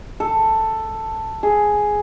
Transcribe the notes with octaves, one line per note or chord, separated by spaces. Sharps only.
A4
G#4